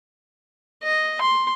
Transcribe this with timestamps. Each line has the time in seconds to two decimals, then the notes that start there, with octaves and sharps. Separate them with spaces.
0.83 D#5
1.22 C6